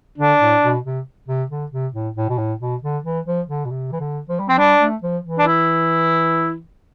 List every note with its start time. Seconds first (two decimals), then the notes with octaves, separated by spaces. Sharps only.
0.18 D3 D4
0.40 A2
0.62 B2
0.84 C3
1.28 C3
1.50 D3
1.72 C3
1.93 A2
2.16 A2
2.29 B2
2.38 A2
2.60 B2
2.82 D3
3.04 E3
3.26 F3
3.48 D3
3.65 B2
3.70 C3
3.92 E3
4.00 D3
4.29 F3
4.39 G3
4.49 F3 C4
4.58 G3 D4
4.80 A3
5.02 F3
5.24 E3
5.38 D4
5.47 E4